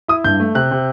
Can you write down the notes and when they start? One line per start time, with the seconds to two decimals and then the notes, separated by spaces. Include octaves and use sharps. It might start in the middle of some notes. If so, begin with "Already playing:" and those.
0.08 E4 D#6
0.24 G2 G6
0.40 A3
0.55 C3 F#6
0.71 C3